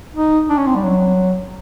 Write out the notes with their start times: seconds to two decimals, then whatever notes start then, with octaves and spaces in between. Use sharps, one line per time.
0.14 D#4
0.49 D4
0.58 C#4
0.66 C4
0.75 G3
0.84 F#3